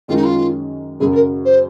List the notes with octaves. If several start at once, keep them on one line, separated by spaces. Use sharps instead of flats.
F#2 D#3 G#3 C#4 F4
D#4
F4
F#2 C#3 F#3 G#4
A#4
C5